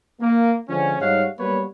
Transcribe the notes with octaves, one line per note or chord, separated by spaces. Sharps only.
A#3
D3 F3 G#3 C#4
G#2 G3 D#4 C#5 F5 F#5
F#3 G3 A#3 B3 B4 C#5